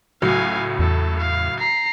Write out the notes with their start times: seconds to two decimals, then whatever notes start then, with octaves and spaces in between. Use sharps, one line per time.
0.22 C#2 A2 F#3 F5 G#5
0.79 E2 A4
1.18 F5
1.59 A#5 C7